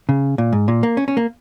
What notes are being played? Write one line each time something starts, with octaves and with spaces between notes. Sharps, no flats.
C#3
A#2
G#2
A#2
A#3
C#4
C#4
A#3